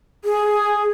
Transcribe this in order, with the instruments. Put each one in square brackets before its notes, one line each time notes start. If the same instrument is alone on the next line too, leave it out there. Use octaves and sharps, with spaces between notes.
[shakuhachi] G#4